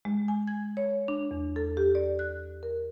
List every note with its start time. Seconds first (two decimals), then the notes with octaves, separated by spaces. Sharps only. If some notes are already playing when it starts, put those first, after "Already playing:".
0.05 G#3
0.28 G#5
0.48 G#6
0.77 C#5
1.08 D4
1.31 E2
1.56 A4
1.77 G4
1.95 D5
2.19 F#6
2.63 A#4